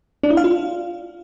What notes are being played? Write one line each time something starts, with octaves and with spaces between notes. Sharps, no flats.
D4
E4
F5
F4